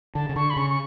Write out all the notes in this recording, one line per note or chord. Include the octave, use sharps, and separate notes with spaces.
D3 A5
C#3
D3 C#6
B5
C#3 C#6
C#6